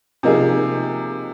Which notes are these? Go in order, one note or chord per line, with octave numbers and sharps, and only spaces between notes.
C3 F3 A#3 D#4 G#4